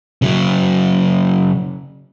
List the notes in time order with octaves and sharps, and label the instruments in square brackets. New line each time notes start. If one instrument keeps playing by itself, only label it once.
[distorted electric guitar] C#3 F#3